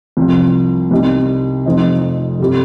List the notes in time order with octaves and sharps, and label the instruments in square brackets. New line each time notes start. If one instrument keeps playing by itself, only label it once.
[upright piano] C2 C3 F3
C2 C3 G3 D#4
F1 F2 F3 C4 D#4
G1 C3 G3